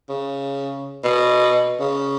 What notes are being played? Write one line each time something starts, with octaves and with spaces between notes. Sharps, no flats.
C#3
B2
C#3